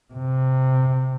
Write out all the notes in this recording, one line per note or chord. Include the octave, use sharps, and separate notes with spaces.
C3